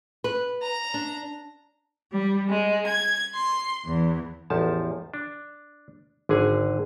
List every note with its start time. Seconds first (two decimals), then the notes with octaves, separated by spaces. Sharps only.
0.24 B4
0.62 A#5
0.94 D4
2.11 G3
2.49 G#3
2.85 G#6
3.33 C6
3.85 E2
4.50 A1 E2 F3 A5
5.14 D4
6.29 G#1 D3 G#4 G#5